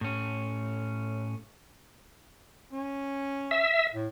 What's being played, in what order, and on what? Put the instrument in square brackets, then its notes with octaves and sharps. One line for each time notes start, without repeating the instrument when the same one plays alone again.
[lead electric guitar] A2 C#4
[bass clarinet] C#4
[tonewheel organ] E5
[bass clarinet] A2